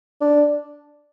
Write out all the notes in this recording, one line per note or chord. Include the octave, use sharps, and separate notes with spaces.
D4